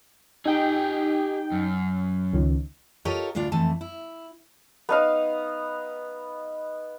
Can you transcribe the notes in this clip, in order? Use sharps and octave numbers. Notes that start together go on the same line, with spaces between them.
D#4 G4 G#4 G5
F#2
C#2 D#3
F4 G4 A4 A#4 C#5 D#5
D2 A2 D4 F4 D5
F2 E3 A3 A5
E4
B3 D#4 F5